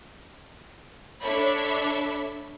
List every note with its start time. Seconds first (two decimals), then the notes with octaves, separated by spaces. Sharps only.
1.21 D4 A4 C#5 E5 B5